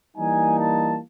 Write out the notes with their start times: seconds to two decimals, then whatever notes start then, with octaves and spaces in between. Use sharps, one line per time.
0.17 E3 G3 A#3 D#4 G#5
0.58 A5